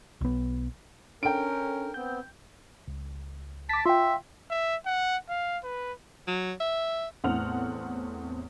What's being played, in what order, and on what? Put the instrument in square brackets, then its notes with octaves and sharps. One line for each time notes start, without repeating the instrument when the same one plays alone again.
[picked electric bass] B1 B3
[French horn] C#4 [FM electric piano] D4 A4 [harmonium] A#4 [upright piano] G5 D7
[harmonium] B3 C4 [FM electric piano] G6
[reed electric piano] C#2
[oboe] A5 [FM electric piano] D6 B6
[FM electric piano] F4 [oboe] E5 [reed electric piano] G5 C6
[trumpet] E5
F#5
F5
B4
[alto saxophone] F#3
E5
[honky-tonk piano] E2 A2 C4 F#5 F6 F7